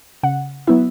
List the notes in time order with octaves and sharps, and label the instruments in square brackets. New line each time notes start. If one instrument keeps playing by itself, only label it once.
[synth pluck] C#3 F#5
F#3 B3 E4 E5